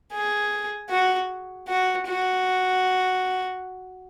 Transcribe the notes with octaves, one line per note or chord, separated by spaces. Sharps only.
G#4
F#4
F#4
F#4